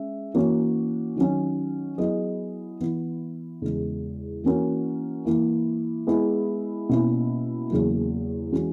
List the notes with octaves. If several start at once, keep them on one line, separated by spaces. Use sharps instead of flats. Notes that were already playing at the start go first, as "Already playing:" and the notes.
Already playing: G#3 C#4 E5
E3 A#3 C#4 F#4 C#5
D#3 F#3 C#4
F#3 B3 E4 G#4 D#5
E3 B3 E4
E2 C#3 G#3
E3 A#3 C#4 F#4 A#4
E3 A#3 E4
G#3 B3 E4 G#4
B2 A#3 C#4 E4
E2 C#3 F#3 A#3
E3 G#3 C#4 F#4